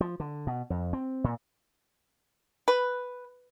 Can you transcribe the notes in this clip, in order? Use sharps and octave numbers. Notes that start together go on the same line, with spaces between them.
F3
D3
B2
F2
C4
A#2
B4